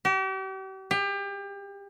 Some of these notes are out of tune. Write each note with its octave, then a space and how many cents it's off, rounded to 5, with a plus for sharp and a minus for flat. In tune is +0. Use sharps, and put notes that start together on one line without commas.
G4 -40
G4 +30